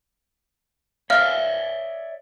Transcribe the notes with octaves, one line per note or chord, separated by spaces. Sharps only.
C#5 D5 E5 F5 F6